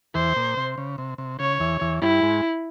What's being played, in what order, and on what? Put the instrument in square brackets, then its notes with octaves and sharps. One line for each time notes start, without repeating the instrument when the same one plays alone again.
[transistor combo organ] E2 E3 [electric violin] C5
[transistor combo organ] A#2
C3
C#3
C3
C3
[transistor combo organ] C#3 [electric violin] C#5
[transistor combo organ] E2 E3
E2 E3
[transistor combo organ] G2 G3 [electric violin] E4
[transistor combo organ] G#2 G#3